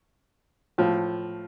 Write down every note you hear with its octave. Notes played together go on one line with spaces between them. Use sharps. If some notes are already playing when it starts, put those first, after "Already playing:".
A2 F3